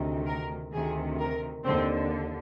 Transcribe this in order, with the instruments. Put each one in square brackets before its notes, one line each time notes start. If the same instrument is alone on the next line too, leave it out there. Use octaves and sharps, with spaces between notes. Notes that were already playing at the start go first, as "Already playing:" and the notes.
Already playing: [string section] D2 C3 D#3
A#4
D2 C3 D#3 G#4
A#4
D#2 D3 C4